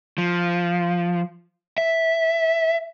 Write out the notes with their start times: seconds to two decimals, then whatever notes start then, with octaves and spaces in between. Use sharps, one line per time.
0.18 F3
1.78 E5